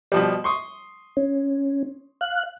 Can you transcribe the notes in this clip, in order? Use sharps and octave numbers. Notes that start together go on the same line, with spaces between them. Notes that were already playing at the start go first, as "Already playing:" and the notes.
B2 F3 G3
C6 C#6 D#6
C#4
F5 F#6